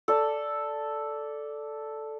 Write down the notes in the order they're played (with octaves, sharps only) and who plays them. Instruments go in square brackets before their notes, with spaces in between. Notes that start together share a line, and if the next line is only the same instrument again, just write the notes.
[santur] A4 D5